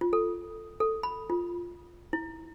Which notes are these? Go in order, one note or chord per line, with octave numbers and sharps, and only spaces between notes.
F4
A4
A4
B5
F4
E4